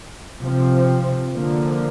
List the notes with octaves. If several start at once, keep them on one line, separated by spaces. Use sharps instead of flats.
C3 F3 C4
D3 F3 A#3